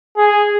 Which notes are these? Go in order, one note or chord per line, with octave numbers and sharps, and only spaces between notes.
G#4